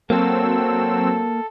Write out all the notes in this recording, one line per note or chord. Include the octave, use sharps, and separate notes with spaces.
F#3 A#3 C4 A4 E6